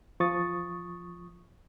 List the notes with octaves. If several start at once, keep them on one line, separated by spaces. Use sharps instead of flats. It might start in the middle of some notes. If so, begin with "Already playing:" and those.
E2 F3 C#6 D#6 A6